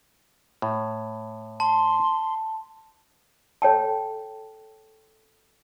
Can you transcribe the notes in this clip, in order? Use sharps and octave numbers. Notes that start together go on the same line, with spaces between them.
A2
A5 C6
A4 C#5 G5 A5